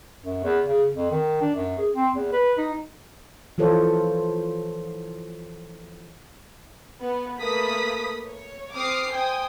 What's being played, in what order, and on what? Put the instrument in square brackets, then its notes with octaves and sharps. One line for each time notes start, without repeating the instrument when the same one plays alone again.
[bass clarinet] F#2
E2
C#3
F2
D#3
D4
F#2
G#4
C4
E2
B4
D#4
[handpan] E3 F3 F4 A4 C5 C#5
[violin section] B3
A3 A#3 B4 D#6 B6
C#5
C4 D6 D#6 F6 C7
C5 G5 G#5 D#6